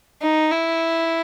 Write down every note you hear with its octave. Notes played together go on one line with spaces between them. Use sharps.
D#4
E4